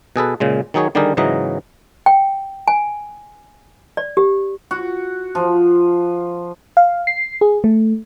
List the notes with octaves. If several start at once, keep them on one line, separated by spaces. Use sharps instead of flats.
B2 G#4 A4 B4
A#2 C#3 G#3
D#3 F#3 D#4 G#4 C#5
D3 D#3 G3 G4 G#4 A#4
G#2 C#3 E3 F#3 D#5 A#5
G5
G#5
D5
G4
F#4
F3
F5
C7
G#4
A3